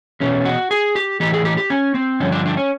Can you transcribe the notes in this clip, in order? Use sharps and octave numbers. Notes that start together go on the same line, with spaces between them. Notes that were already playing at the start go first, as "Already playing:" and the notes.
E2 B2 C#4
F#4
G#4
G4
A2 E3 G4
G#4
G4
G4
C#4
C4
G2 D3 F3 C#4
D4
D4
C#4